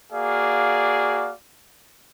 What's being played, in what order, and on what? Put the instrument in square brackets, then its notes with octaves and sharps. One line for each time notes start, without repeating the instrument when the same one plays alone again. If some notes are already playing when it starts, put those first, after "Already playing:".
[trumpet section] A#3 F#4 G#4 D5 F5